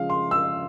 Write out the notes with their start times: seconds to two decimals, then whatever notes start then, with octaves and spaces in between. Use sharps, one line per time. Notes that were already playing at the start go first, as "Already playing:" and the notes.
Already playing: C#3 F3 G#3 F5
0.10 C6
0.31 E6